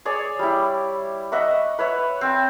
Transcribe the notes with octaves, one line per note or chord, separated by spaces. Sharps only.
G#4 C#5 D5
G3 E4
D#5 E5 F#5 C#6
B4 C#5 E5
C4 G5